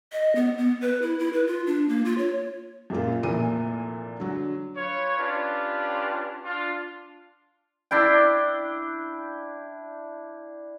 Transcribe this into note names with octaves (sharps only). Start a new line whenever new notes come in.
D#5
B3
B3
B4
E4
E4
B4
F4
D4
A#3
F4
C#5
F#2 A#2 A#3 F4
F1 A#2 E3 A#3 D#7
D3 F#3
F4 B4 C#5
C#4 D4 F4 G4 B4
D4 F4
D4 E4 G5